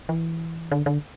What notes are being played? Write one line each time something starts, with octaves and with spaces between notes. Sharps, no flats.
E3
D3
D3